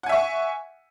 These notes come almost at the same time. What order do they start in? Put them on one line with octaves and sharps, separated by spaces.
F#5 G#5 E5 C#6